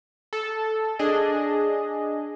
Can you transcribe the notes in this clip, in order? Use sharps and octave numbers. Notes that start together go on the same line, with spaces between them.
A4
D4 G#4 D#5